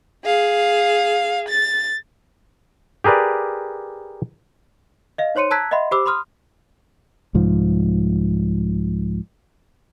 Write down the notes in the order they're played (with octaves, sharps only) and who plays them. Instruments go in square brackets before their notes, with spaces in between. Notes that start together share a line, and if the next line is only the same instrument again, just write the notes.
[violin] G#4 F5
A6
[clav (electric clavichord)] G4 G#4 A#4 B4 D5
[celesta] D#5 F5
D#4 C5 C#5 C6 C#7 D#7
A5 A#5 E6 F#6 G#6 B6
D#5 E5 F#5 B5 C6
G4 C5 B5 D6 E6
B5 C6 D#6 F6
[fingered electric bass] C2 G#2 F3